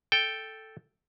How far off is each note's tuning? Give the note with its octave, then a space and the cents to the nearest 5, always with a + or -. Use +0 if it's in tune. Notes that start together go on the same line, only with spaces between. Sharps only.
A4 +0 G5 +0